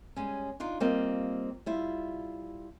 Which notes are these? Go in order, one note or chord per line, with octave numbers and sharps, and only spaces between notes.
G3 G#3 C#4
D4 D#4 F4
G3 A#3 C4 F4 D#5
G3 E4 F4